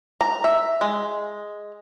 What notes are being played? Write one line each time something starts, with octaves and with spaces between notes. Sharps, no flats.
A#5
E5
G#3